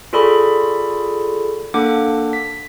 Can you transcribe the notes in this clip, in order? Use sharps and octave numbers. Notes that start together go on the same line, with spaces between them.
F4 G#4 A4 D5 B5 C#6
A#3 D4 A4 F#5 D6
B6